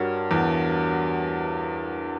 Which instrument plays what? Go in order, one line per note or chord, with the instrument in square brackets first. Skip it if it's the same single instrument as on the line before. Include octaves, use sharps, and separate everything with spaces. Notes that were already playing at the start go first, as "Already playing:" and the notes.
Already playing: [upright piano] G2 [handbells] D4 F#4 A#4 C#5 F#5
[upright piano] E2